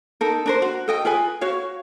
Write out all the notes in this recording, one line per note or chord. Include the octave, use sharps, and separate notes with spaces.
D#4 A4 A#4
D4 A#4 C5
F#4
A4 D#5 G5
F4 G#4 B4 G#5
F#4 C#5 F5